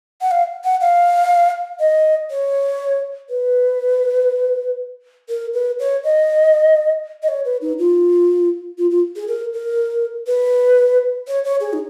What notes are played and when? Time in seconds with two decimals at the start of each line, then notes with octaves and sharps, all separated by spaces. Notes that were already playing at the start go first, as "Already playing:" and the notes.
0.22 F#5
0.31 F5
0.64 F#5
0.81 F5
1.80 D#5
2.30 C#5
3.30 B4
5.29 A#4
5.54 B4
5.79 C#5
6.04 D#5
7.23 D#5
7.28 C#5
7.45 B4
7.62 D#4
7.79 F4
8.78 F4
8.91 F4
9.16 G#4
9.28 A#4
9.53 A#4
10.27 B4
11.28 C#5
11.45 C#5
11.60 G#4
11.73 D#4